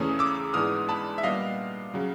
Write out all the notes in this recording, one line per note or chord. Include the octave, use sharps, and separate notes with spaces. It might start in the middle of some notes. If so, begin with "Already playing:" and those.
Already playing: E2 C#3 E3 A3 C#4 D#6
D6 E6
G#2 E3 G#3 B3 D4 D#6 F6
A5 B5
E5
A#2 G3 B3 D4 D#5 F5
C#3 F#3